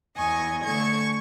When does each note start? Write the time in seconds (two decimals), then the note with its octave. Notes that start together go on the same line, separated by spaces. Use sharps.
0.16 E2 D#5 G#5 C#6
0.63 D3 A3 C#6 G#6